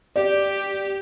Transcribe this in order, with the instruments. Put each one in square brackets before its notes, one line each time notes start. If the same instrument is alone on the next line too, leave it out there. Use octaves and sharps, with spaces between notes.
[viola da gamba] G4 [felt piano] D5